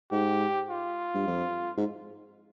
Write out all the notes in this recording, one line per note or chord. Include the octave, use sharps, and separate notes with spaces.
G#2 G4
F4
G2
F2
G#2